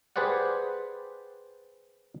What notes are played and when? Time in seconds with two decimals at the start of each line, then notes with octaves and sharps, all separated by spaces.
0.16 G4 G#4 B4 C5 D5 F#5